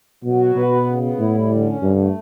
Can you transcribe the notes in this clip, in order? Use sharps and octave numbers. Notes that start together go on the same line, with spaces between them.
B2 F#3
F#4
B2 B4
B3
C#3
B3
A2 E4
G3
D3
C#4
G2 D3
A3